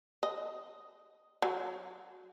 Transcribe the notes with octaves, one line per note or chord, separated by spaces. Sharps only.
D#5
F#3